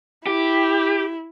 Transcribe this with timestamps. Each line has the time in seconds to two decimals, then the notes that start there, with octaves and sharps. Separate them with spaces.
0.27 E4 G4